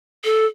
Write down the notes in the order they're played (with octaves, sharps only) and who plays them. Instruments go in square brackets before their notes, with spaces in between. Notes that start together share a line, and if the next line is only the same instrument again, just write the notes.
[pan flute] A4